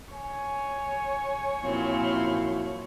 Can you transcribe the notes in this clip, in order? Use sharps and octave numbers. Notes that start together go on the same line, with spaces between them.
C#5 G#5
F#2 A#2 F3 C4 E4